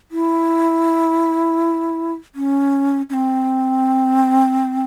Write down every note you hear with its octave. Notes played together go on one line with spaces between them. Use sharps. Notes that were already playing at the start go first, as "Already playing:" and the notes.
E4
C#4
C#4
C4